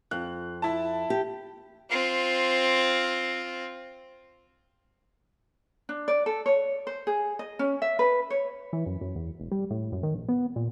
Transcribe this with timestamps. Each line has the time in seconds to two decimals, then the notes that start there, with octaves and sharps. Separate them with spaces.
0.11 F2 F#6
0.62 E4 A5
1.10 G4
1.90 C4 F4
5.89 D4
6.08 D5
6.26 A4
6.46 C#5
6.87 C5
7.07 G#4
7.39 D#5
7.59 C#4
7.82 E5
7.99 B4
8.30 C#5
8.73 E3
8.86 F#2
9.01 F#2
9.15 E2
9.40 E1
9.52 G3
9.70 A2
9.92 F#2
10.03 D#3
10.15 A#1
10.28 B3
10.56 A#2